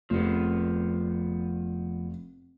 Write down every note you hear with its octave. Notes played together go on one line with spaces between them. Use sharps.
F1 F3 B3